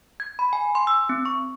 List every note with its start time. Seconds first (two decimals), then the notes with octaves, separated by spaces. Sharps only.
0.20 G#6
0.39 B5
0.53 G#5
0.75 C6
0.87 E6
1.09 C4
1.25 C#6